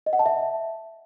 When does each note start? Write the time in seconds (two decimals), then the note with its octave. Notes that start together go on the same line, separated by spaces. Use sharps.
0.06 D#5
0.13 F#5
0.19 A5
0.26 E5